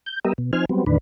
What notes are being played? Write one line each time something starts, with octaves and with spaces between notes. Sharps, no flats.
G6
G3 B3 G4 A#4 D#5 E5
B2
F3 C4 D#4 C5 G#5 F6
F#3 G3 B3 C4
E2 A2 D3 D#3 D4 B4